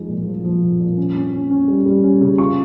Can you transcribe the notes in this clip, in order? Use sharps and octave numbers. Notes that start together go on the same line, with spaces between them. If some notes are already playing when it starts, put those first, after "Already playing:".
Already playing: F3 G#3 D#4
A#2
F3
F3
A#2
A#2
C#4
C#4
C#4
C#4
G3
G3
C#4
C#3
F4 C#6